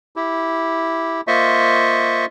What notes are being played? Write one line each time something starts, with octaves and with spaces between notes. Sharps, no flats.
E4 G4
A#3 F4 C5 D#5 E5 C#6